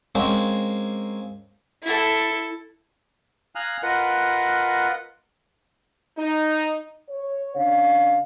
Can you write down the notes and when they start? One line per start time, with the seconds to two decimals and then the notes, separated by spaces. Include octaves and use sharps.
0.15 G#3 A#3 C4 C#4 C5
1.83 E4 A4
3.55 F5 G#5 A#5 D#6 F6 F#6
3.83 F4 A#4 B4 D#5 F#5
6.18 D#4
7.09 C#5
7.55 C#3 D4 F5